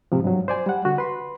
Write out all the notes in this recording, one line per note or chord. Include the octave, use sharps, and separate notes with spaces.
G#2 C3 F3
G2 F#3
C5 D5 G#5
G3 F#5
D3 F#4
B4 C6